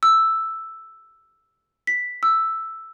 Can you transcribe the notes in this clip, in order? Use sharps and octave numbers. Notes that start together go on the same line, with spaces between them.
E6
B6
E6